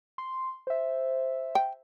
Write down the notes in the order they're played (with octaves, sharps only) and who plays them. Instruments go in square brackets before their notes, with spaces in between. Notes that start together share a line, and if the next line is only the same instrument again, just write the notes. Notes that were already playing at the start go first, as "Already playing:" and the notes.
[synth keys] C6
C5 E5
[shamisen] G5